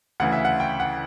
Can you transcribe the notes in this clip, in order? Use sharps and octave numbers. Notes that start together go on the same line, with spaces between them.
D2 C#3 E3 F#5
E5
F#5
G5
F#5